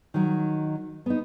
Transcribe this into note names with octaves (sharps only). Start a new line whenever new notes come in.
D#3 F#3
B3 D#4